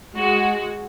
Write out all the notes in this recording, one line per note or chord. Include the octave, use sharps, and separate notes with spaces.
G#3 F#4